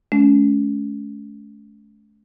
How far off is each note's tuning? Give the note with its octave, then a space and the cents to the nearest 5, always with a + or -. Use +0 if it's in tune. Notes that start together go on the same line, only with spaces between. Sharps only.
A3 -45 C#4 +30